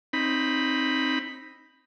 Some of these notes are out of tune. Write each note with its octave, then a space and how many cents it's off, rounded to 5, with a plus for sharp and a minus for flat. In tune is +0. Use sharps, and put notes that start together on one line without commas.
C4 +15 D#4 +0 B5 +0